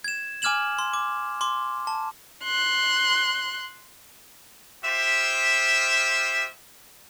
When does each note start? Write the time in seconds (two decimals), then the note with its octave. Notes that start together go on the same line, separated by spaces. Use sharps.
0.04 G#6 E7
0.42 G#5 D6 F6 G#6 E7 F#7
0.79 C6
0.93 D6
1.41 C6 D6
1.87 A5
2.44 C6 F#6
4.84 F4 G4 C5 E5